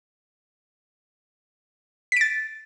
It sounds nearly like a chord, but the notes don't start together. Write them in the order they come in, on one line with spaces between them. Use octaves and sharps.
B6 D7 A6